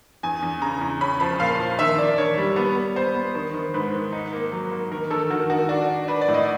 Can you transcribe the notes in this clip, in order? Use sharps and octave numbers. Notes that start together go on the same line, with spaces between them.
E2 G#5
E2
C#3 A#5
E2
C#4 B5
F3 B5
A#2 F5
F3
D#3 E5
A#3 D5
D#3 C#5
G3
B3
B3
B3 C5
B3
D#3
D#3
G#2 B4
D#3
D#4
A#3
F#3
A#3
D#3 A#4
D#3 A4
D#3 F#4
D#3 F#4
D4 F#4
D4
D4 B4
D5
A2
D#5